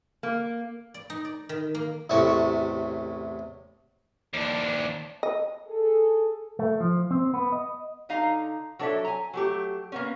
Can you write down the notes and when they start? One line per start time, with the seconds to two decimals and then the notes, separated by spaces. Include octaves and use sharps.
0.23 A#3
0.94 D5
1.10 D#4
1.25 D5
1.49 D#3
1.75 A#3
2.10 A1 E2 A2 C3 E5 C#6
4.33 D#2 D4
5.23 D#5
5.68 G#4 A4
6.59 A3
6.80 F3
7.11 C4
7.34 B3
7.52 D#5
8.09 D3 D#4 F5 A#5
8.79 F#3 D4 A4 C#5 E5
9.05 G#5 A#5
9.34 F#3 A3 G4
9.92 A#3 B3 C#4